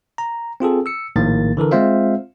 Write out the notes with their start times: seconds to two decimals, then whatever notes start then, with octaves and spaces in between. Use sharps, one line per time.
0.18 A#5
0.60 C4 F4 G#4 A4
0.86 E6 C#7
1.16 A#1 A2 D#3 A#3 A6
1.57 D3 E3 A4 A#4
1.71 G#3 C4 F4 C5 E5 F5